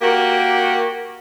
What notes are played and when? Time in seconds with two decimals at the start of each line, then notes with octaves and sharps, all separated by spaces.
0.01 A#3 F#4 G4 A#4